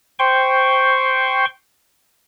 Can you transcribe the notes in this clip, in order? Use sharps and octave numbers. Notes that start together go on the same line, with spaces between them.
C5 G5 C6 C#6